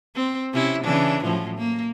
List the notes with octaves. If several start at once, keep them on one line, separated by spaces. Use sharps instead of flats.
C4
C3 C#4 E4
C#3 E3 D4
F#2 A2 F3
A#3